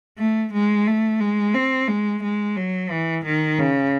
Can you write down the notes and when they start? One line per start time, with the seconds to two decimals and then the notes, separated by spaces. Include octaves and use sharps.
0.18 A3
0.53 G#3
0.87 A3
1.20 G#3
1.54 C4
1.88 G#3
2.23 G#3
2.57 F#3
2.91 E3
3.25 D#3
3.59 C#3